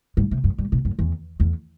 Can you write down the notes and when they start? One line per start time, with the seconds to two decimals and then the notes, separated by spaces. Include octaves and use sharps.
0.17 G2
0.31 C3
0.44 F#2
0.58 G2
0.72 B2
0.85 F#2
0.99 E2
1.40 E2